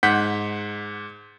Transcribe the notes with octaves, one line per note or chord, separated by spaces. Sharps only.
G#2 F#5 G6 B6